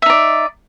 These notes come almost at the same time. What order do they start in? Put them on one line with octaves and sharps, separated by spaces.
E5 D#4 D5